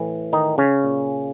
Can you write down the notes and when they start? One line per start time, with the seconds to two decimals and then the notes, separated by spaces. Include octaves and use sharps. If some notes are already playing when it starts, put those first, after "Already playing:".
Already playing: A2 E3
0.33 D#3 D#4
0.58 C#3 C#4
0.84 A#2